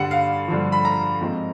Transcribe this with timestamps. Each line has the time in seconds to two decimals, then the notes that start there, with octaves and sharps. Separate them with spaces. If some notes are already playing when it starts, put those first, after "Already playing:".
Already playing: G2 D3 G3 F#5
0.11 F5
0.48 G2 D3 F3
0.72 B5
0.85 A#5
1.21 G#2 F3 G#3 C4